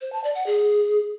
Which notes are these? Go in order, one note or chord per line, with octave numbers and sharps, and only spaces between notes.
C5
A5
D5
F#5
G#4